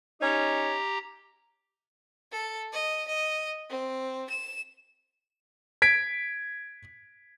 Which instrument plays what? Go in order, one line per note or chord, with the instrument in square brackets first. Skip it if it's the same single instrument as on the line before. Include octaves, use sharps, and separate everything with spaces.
[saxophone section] C#4 D#4 C#5 [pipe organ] G4 A#5
[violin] A4
D#5
D#5
C4
E7
[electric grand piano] G#6 B6 D7